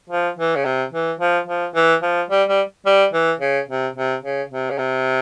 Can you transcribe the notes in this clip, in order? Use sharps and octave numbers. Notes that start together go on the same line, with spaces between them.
F3
E3
C#3
C3
E3
F3
F3
E3
F3
G3
G3
G3
E3
C#3
C3
C3
C#3
C3
C#3
C3